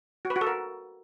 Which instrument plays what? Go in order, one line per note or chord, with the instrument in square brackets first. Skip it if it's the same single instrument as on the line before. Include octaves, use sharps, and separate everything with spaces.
[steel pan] F#4
B4
F#4
A4
A#4